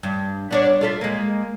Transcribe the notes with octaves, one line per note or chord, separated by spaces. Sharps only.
G2
B3 D4 C#5
F4 A4 E5
G#3 A#3